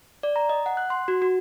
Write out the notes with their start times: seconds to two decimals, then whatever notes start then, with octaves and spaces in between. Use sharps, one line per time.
0.23 D5
0.36 A#5
0.49 D#5
0.66 F#5
0.77 F#6
0.90 C6
1.08 F#4
1.22 F#4